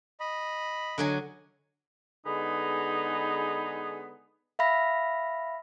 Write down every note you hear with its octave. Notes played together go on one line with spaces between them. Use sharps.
D#5 B5
D3 F#3 D#5 G#5
D3 G#3 B3 D#4 G#4 B4
E5 F5 B5 A#6